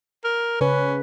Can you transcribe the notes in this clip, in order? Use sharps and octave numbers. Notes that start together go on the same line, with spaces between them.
A#4
C#3 C#4 B4